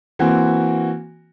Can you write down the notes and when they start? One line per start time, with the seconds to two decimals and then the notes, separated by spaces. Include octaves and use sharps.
0.19 E3 A#3 C4 F#4